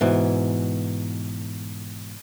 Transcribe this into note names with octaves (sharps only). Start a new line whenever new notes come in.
G#2 B2 E3